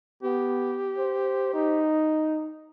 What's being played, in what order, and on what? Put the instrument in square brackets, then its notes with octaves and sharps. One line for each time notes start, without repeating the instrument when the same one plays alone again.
[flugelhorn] B3 [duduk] G4
[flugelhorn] C5
D#4